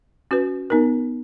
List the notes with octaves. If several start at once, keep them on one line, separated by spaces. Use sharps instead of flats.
C#4 F#4 B4
B3 D#4 A#4